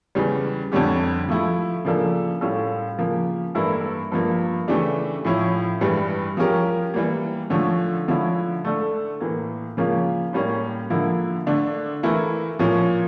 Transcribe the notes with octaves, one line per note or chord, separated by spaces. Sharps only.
E2 C#3 G3
F2 D3 G3 C#4 G4
F3 A3 E4
C#3 F3 A#3 D4 A4
A2 G3 C#4 F4 A4
C#3 F3 A#3
G2 E3 A#3 E4 A4
G2 F3 A#3
C#3 E3 A3 D4 G4
A2 F3 C#4 E4
G2 E3 G3
F3 C#4 G4 A#4
E3 G3 A#3
D3 F3 A3 C#4
D3 F3 C#4 E4
D3 A3 D4 A4
A2 E3 A#3
C#3 F3 A#3 C#4 F4
A2 G3 A#3 C#4
D3 F3 A#3 E4
D3 A3 D4
E3 A3 E4 A#4
A#2 F3 C#4